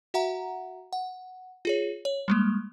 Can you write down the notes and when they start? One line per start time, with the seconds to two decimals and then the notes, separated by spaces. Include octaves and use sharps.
0.14 F#4 E5 F#5 A#5
0.93 F#5
1.65 F4 G#4 C#5
2.05 C#5
2.28 G3 G#3 A#3